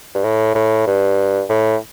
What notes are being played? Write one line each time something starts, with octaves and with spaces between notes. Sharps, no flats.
G2
A2
A2
G2
A2